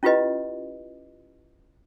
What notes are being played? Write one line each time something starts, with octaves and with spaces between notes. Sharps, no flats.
C#4 E4 F4 G4 B4 D#5